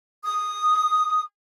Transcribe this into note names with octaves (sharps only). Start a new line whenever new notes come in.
D#6